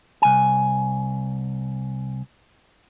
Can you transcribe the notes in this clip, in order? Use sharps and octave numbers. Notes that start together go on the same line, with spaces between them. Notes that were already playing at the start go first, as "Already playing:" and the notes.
C2 G#5